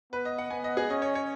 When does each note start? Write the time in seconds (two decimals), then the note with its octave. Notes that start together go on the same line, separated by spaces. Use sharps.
0.12 B3 B4
0.25 D#5
0.38 F#5
0.50 B3 G#5
0.64 D#5
0.77 G#4
0.90 C#4 D#5
1.02 C#5
1.15 C#5